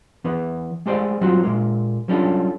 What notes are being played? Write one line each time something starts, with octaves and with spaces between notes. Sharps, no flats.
E3 B3 B4
G#3 A3 G4 G#4 C5 D5
F#3 G3 C4 F4 F#4
A#2 G#3 A#3
F#3 G3 C#4 D4 F4 A4